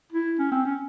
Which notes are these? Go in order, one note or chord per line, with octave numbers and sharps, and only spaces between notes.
E4
C#4
C4
C#4